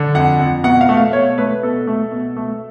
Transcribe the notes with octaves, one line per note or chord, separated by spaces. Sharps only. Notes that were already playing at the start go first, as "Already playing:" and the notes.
Already playing: D3
F2 F#5
F2
B2 F#5
F5
A3
F5
B2 C#5
A3 B4
B2 A4
A3
B2
A3